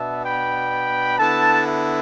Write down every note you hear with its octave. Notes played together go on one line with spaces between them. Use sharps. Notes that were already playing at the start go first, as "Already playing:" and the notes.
Already playing: B2 B3 D4 E5 A5
G5 B5
D3 B3 E4 E5 A5
E5 A5